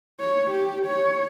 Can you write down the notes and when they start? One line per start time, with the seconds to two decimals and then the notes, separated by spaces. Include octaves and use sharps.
0.20 C#5
0.50 G4
0.86 C#5